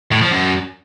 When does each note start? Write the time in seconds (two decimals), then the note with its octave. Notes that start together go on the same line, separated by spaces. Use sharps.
0.12 A2
0.22 F3
0.31 F#2